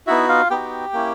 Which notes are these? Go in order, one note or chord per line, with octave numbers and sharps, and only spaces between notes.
B3 D#4 E4 F#4 E5
F4 F5
B3 D#4 F#4 G4 G5
A#3 C#4 E4